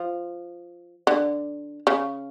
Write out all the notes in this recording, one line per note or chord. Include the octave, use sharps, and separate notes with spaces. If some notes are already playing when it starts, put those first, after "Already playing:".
Already playing: F3
D3
C#3